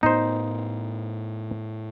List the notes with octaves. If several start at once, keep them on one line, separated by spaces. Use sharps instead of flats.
A2 B3 D#4 C5